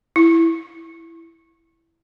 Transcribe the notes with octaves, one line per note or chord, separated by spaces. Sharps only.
E4